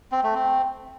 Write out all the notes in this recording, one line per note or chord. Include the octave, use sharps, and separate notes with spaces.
C4
A3
C4